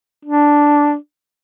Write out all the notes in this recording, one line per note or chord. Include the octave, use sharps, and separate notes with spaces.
D4